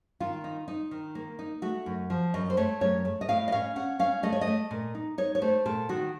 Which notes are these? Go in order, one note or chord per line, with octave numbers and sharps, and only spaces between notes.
D#3 F4
D#4
D#4
D#3
A#3
D#4
A3 F#4
F#2
F3
F#2 D#5
C5
A3 C#5
F#2 C#5
A3
D#5
A2 F5
D#5
C#4 F5
C#4 F#5
C#4 F5
A3 D#5
C#5
D#5
A3
A#2
D#4
D#4 C#5
C#5
A3 C5
A#2 A4
D#3 F#4